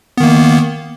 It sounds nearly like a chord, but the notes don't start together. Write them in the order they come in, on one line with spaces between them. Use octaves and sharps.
B3 D#3 A#3